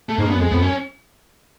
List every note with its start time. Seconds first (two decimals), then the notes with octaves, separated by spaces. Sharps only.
0.09 A3
0.18 G#2 A#3
0.25 G2
0.30 F#2 B3
0.41 F2 G#3
0.51 F2 B3
0.61 F#2 C#4